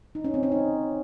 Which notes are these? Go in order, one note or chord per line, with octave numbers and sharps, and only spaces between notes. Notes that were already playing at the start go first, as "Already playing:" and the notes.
D#4
C#4
C4
C#4
D#4